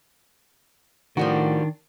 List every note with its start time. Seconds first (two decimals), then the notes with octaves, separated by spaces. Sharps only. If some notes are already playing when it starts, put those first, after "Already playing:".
1.17 A2 D#3 F3 G3 D4 F#4 A#4